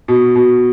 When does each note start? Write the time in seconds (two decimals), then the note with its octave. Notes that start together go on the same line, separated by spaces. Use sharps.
0.08 B2
0.35 B2